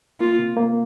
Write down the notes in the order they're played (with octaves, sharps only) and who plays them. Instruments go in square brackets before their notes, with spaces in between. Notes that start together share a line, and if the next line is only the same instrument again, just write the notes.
[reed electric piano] A#3 [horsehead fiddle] F4
[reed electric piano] C3
A#3